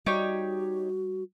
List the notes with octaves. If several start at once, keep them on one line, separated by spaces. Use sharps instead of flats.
G3 D#4 F#4 G4 C#5